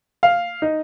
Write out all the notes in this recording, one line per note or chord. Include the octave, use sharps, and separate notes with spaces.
F5
D#4